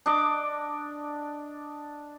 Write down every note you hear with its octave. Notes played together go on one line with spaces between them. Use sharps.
D4 D#5 D6